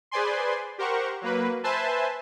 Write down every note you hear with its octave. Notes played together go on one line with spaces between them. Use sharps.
G#4 B4 C5 D5 G#5 C6
G4 A#4 C5 F#5 C#6
F#3 A#3 B4
B4 C5 E5 G#5 A5 C6